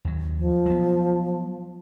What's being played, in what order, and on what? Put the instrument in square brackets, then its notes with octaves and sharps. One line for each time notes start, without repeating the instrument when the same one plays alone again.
[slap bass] D#2 F#3
[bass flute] F3
[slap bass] F#3 B3